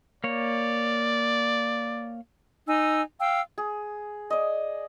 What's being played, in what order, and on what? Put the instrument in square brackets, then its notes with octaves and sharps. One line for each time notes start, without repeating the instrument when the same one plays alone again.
[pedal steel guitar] A#3 C#5 [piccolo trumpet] D5
[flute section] D#4 G#5 E6
F5 G5 E6
[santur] G#4
D5 D#5